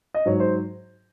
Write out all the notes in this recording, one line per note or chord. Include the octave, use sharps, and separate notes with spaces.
D#5
G#2 F#3 C#5
C5